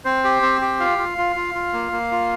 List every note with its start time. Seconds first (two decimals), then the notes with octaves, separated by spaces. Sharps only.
0.05 C4 C5
0.24 G4
0.42 C4
0.61 G4
0.80 F4 F5
0.98 F4
1.18 F4
1.36 F4
1.55 F4
1.73 A#3
1.92 A#3
2.11 F4